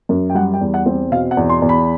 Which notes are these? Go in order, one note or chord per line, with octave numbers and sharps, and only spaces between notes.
F#2
G5
G3 F#5
G5
E2
F#5
C4
B2 F5
F#5
E2
C6
E2
B5